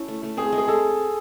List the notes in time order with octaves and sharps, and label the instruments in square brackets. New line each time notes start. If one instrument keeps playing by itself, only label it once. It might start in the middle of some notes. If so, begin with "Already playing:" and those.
Already playing: [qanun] C#4 E4 A4
A3
A3
[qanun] C4 [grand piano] G#4
[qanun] G#3
[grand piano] G#4
[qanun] G#3 [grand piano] A4